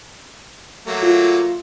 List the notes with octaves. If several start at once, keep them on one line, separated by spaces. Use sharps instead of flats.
F#3 A3 A#3
F4